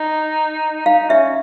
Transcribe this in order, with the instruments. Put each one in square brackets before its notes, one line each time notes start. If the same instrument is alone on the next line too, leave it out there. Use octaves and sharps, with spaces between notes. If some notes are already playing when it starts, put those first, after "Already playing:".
Already playing: [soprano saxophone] D#4
[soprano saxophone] D#4 [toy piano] F5
[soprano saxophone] C#4 [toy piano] E5